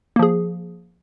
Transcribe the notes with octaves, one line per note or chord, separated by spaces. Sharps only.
F3 A#3 G#4